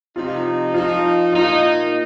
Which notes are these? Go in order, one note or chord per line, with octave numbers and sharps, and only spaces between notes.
C3 F3 D#4 F4
F3 D#4 F4
A#2 A#3 D#4 F4